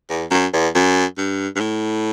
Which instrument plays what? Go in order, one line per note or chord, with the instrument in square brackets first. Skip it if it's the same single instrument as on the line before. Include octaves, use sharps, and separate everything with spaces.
[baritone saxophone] E2
F#2
E2
F#2
G2
G2
A2